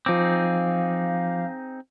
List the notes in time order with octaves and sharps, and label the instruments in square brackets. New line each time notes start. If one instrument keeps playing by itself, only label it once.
[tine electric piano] F3 D6 [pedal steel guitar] C4 D#4 G#4 [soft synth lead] F5